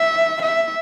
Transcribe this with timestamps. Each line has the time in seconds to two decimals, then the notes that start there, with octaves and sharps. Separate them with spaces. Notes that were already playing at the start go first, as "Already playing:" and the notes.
Already playing: E5
0.43 E5